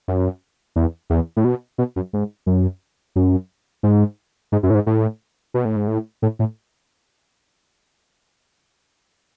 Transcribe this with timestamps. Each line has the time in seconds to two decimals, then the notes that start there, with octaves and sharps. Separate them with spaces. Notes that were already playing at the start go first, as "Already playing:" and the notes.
0.08 F#2
0.76 E2
1.10 E2
1.37 A2
1.44 B2
1.78 B2
1.96 F#2
2.13 G#2
2.46 F#2
3.16 F#2
3.83 G#2
4.52 G#2
4.63 F#2
4.70 A2
4.75 G#2
4.86 A2
5.54 B2
5.65 A2
5.76 G#2
5.87 A2
6.22 A2
6.39 A2